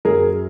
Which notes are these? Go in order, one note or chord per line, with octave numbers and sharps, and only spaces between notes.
F#2 G#4 A#4